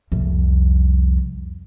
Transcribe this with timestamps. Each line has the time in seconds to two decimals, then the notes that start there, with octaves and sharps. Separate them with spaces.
0.12 C2 F2